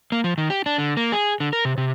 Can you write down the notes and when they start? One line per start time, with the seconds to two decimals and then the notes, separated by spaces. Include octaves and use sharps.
0.12 A#3
0.24 F3
0.38 D#3
0.50 G4
0.66 D4
0.78 D3
0.97 A#3
1.12 G#4
1.40 D3
1.53 A#4
1.65 C3
1.78 C3